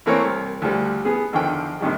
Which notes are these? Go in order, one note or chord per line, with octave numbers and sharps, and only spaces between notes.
E3 A3 A#3 C4 A#4 C#5
C2
D2 D3 F3 G3
B3 G#4
E2 D3 D#3 F3 G5
A#1 C3 D#3 G3